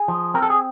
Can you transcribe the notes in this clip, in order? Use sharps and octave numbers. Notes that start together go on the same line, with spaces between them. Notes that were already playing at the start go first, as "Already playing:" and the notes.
Already playing: G#4
F3
C4 A#4
A4
G#4